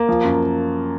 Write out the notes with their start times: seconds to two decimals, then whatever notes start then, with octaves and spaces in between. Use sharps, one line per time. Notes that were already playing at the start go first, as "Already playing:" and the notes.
Already playing: A#3
0.09 F3
0.25 F#2